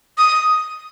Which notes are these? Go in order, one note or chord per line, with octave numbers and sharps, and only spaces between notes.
D#6